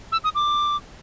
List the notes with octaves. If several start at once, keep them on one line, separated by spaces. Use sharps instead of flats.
E6
D#6
D6